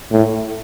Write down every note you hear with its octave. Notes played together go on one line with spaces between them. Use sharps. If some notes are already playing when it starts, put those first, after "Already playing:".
A2